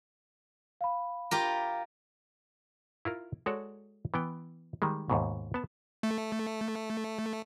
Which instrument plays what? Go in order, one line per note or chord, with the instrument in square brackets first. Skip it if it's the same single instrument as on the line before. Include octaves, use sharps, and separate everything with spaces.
[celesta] F5 B5
[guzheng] F4 G4 A#4
[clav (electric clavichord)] E4 F4 A#4
G#3 F#4 A4 C#5 D5
E3 B3 G5
D#3 G3 G#3
D#2 G#2 B2
B3 A5
[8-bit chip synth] A3